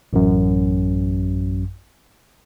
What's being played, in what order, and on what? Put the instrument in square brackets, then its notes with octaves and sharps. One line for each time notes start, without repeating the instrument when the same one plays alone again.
[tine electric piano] A1 F#2